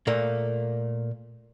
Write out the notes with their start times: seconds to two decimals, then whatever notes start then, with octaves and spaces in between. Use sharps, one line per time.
0.07 A#2 A3 A#3